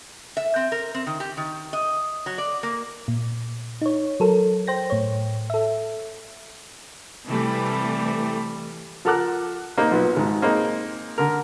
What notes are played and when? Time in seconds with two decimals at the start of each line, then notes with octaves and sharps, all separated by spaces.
0.37 E5
0.56 C4
0.72 A#4
0.95 C4
1.07 D#3
1.20 G4
1.37 D#3
1.73 D#5
2.26 F#3
2.38 D5
2.63 A#3
3.08 A#2
3.81 D#4 C#5
4.20 F#3 A4 A#4
4.67 C5 G5 A#6
4.90 A2 C#5
5.50 A4 E5
7.27 C3 E3 G3 A3
9.05 F3 A4 A#4 F#5 D6 F#6
9.78 A#3 C4 D#4 G4
9.91 B1 A#2 B3
10.16 G#1 G#2
10.42 A#3 C4 D#4 G#4
11.18 D3 A#4